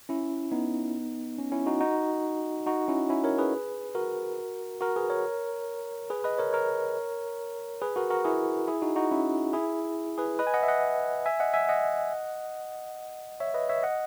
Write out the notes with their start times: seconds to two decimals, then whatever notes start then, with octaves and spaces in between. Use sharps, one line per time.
0.09 C#4 E4
0.51 B3 D#4
1.38 C#4
1.52 C#4 E4
1.66 D#4 F#4
1.80 D#4 F#4
2.66 D#4 F#4
2.88 C#4 E4
3.09 C#4 E4
3.24 A#4 C#5
3.38 G#4 B4
3.95 F#4 A#4
4.81 F#4 A#4
4.96 G#4 B4
5.10 A#4 C#5
6.10 G#4 B4
6.24 B4 D#5
6.39 A#4 C#5
6.53 A#4 C#5
7.82 G#4 B4
7.96 F#4 A#4
8.10 F#4 A#4
8.24 E4 G#4
8.68 E4 G#4
8.82 D#4 F#4
8.96 D#4 F#4
9.11 C#4 E4
9.53 E4 G#4
10.18 G#4 B4
10.39 B4 D#5
10.47 G#5
10.54 D#5 F#5
10.63 E5
10.68 D#5 F#5
11.26 E5 G#5
11.40 D#5 F#5
11.53 E5 G#5
11.69 D#5 F#5
13.40 C#5 E5
13.54 B4 D#5
13.69 C#5 E5
13.83 D#5 F#5